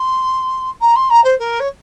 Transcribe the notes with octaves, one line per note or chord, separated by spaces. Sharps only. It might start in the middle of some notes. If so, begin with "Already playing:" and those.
Already playing: C6
A#5
C6
A#5
C5
A#4
C#5